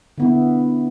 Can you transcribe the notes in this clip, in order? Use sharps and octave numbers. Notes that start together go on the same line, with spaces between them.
D3 B3 E4